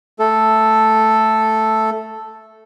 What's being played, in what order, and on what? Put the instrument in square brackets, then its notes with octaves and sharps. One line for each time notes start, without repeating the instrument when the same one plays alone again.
[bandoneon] A3 A4